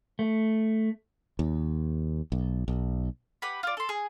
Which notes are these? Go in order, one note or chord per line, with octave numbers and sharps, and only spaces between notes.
A3
D#2
B1
B1
G4 B4 F#5 B5
F4 D5
A4 C6
G#4